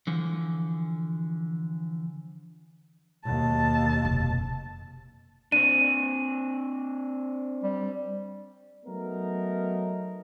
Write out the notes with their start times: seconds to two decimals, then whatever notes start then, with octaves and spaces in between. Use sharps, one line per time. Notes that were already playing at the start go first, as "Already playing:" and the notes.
0.07 D3 E3 F3
3.26 D#2 B2 A5
4.05 F1
5.52 C4 D4 D#7
7.63 G3
8.86 F#3 A3 B3 D#4 A#4